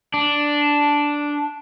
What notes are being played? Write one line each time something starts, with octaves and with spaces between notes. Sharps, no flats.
D4